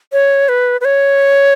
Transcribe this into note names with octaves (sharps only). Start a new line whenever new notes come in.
C#5
B4
B4
C#5